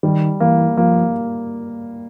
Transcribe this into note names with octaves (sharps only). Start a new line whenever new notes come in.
D#3 G3
E3 A#3
F3 A#3